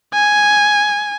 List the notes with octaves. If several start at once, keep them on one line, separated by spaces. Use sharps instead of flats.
G#5